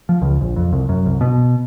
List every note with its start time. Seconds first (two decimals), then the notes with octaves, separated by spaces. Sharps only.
0.09 F3
0.22 C#2
0.41 A#1
0.56 F2
0.73 C2
0.89 F#2
1.06 C2
1.21 B2